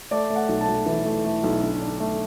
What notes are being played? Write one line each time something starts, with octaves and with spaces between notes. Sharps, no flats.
A3 D5
A3
F#5
B1
A5
B1
E3
A3
A3
B1
D3
D4
A3